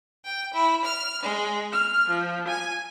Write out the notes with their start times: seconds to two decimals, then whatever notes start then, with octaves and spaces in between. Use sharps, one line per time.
0.25 G5
0.53 E4
0.84 F6
1.23 G#3
1.73 F6
2.08 F3
2.47 G#5